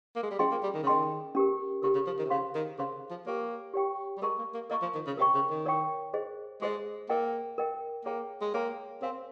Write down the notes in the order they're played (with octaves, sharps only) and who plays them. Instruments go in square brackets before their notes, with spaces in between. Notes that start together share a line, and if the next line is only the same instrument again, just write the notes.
[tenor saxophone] A#3
G#3
G3
[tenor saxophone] F3 [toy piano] C#4 G#4 D#5 G5 C6
[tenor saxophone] A#3
G3
D#3
C#3
[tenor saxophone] D#3 [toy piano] C#4 G#4 D#5 G5 C6
[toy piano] C#4 G4 A#4
[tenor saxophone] C#3 [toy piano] C#4 G4 A#4
[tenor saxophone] C#3
F3
D#3
C3
[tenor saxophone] C#3 [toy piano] G#4 C5 F5 C6
[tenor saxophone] D#3
[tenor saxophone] C#3 [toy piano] G#4 C5 F5 C6
[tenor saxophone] F3
[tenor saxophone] A#3 [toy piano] G4 C#5 G5 C#6
[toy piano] G4 C#5 G5 C#6
[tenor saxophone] G3
[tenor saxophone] G#3 [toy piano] A#4 D#5 A#5 C#6
[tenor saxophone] A#3
A#3
[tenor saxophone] A#3 [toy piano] A#4 D#5 A#5 C#6
[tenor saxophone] F3
D#3
C#3
[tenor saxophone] C3 [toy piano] A#4 C#5 G5 C#6
[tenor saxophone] C#3
D#3
[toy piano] A#4 C#5 G5 C#6
G#4 C5 D#5
[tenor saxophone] G#3 [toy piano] G#4 C5 D#5
[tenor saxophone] A#3 [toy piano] A#4 D#5 G5
[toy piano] A#4 D#5 G5
[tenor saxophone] A#3 [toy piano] G#4 C#5 G5 A#5
[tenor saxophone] G#3
[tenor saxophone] A#3 [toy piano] G#4 C#5 G5 A#5
[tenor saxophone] C4 [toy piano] A#4 C#5 F5 G#5 C6